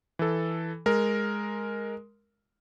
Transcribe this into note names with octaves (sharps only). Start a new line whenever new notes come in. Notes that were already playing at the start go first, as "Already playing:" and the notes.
E3 A4
G#3 A#4